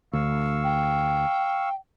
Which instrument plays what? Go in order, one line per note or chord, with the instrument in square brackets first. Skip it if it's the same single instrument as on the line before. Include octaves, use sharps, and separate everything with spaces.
[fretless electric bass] D2 [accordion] F5 C#6 E6
[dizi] G5